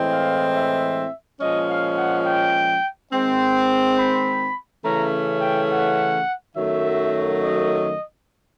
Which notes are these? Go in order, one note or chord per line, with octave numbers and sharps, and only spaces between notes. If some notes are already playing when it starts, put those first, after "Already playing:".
Already playing: A2 E3 G#3 C4
F5
E5
A#2 F3 G#3 C#4 D#5
F5
F#5
G5
D#3 G#3 C4
B5
C#3 E3 A3 C#4 A#5
G5
F#5
F#2 D#3 F#3 A3 E5
D#5